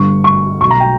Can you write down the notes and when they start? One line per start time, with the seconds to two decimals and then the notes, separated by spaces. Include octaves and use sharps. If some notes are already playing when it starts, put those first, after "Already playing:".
Already playing: G1 G2 D3 C#6
0.24 C#6
0.61 B1 B2 C#6
0.71 A#5
0.80 G5